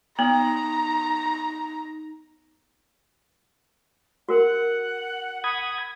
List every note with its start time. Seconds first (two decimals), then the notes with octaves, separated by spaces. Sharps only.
0.19 B3 D#4 A#5
4.29 F#4 A#4 F#5
5.44 B5 D#6 G#6